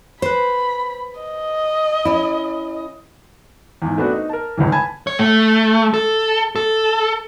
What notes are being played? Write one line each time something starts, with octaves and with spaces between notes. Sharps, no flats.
B4 C5 B5
D#5
C#4 E4
E2 G#2
A3 B3 C4 D4 F#4
D#4
A#4 A5
G1 C#2 G#2 C#3 E3
G#5 A5 B5 G#6
C#5
A3
A4
A4